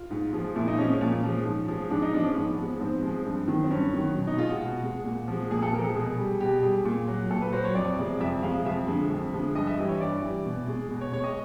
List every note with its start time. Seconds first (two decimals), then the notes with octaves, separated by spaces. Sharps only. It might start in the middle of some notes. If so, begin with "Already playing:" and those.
Already playing: F4
0.10 G#2
0.33 F3 G#3
0.55 A#2 E4
0.68 D#4
0.78 F3 G#3 C#4
0.89 C#4
1.01 A#2
1.23 F3 G#3
1.45 G#2
1.68 F3 G#3
1.90 G#2 D4
2.02 D#4
2.14 F3 G#3 D4
2.25 C#4
2.36 G#2 B3
2.58 F3 G#3
2.80 G#2 C4
3.03 F3 G#3
3.25 G2
3.48 D#3 F#3
3.64 C4
3.70 G2 C#4
3.94 D#3 F#3
4.16 B2
4.27 D#4
4.37 G#3 F4
4.49 F#4
4.60 B2
4.83 G#3
5.05 A#2
5.28 F3 G#3
5.51 A#2 G#4
5.62 A4
5.73 F3 G#3 A#4
5.84 A4
5.95 B2 G#4
6.18 G3
6.40 B2 G4
6.63 G3 G#4
6.85 A#2
7.08 F#3
7.30 A#2 A4
7.41 B4
7.52 F#3 C5
7.64 C#5
7.75 F2 D5
7.98 C3 F3 G#3
8.20 F2 E5
8.43 C3 F3 G#3 F5
8.65 F2 E5
8.87 D3 F3 G#3
9.10 F2
9.33 D3 F3 G#3
9.55 G2 D#5
9.67 E5
9.78 E3 G3 D#5
9.89 C#5
10.00 G2 D5
10.23 E3 G3
10.45 B2
10.67 G#3
10.90 B2
11.01 C#5
11.13 G#3 C#5
11.24 D#5